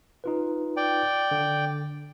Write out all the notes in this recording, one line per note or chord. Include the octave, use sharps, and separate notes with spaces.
D#4 F4 B4
D5 G5
D3